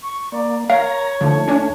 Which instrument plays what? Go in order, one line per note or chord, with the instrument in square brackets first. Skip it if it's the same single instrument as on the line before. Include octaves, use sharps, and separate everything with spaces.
[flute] C#6
[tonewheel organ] A#3 [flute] D5
[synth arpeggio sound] A#4 [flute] C#5 [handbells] F5 [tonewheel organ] A#5
[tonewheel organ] D#2 A3 [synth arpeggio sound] D3 F3
[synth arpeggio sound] C#4 D4